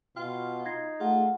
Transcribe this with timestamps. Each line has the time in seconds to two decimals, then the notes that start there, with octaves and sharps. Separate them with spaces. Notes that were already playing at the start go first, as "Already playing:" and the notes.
0.16 B2 F4 G5 F6
0.66 D#4 G#6 A#6 C7
1.00 A3 F4 G#4 F#5